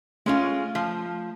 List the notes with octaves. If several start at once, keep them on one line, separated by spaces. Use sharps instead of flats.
G#3 A3 C#4 F4
F3